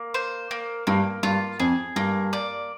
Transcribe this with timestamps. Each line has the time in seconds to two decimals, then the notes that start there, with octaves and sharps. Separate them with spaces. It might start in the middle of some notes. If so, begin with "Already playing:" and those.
Already playing: A#3
0.14 C5
0.51 A#3
0.87 G2 A#3
1.23 G2 F4
1.60 F2 G#4
1.96 G2 A#3
2.33 D5